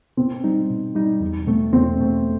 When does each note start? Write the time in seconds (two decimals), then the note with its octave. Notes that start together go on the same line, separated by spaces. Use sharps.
0.17 B2 C4
0.44 G3 D#4
0.70 B2
0.95 G3 D#4
1.20 E2
1.47 B2 A3 C4
1.73 E2 C4
1.98 B2 A3 C4